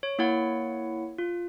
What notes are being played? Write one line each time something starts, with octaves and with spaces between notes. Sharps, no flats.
C#5
A#3 E4 C#5 F#5
F4